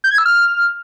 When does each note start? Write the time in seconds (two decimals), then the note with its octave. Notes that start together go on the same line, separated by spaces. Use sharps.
0.04 G6
0.11 G#6
0.18 E6
0.25 F6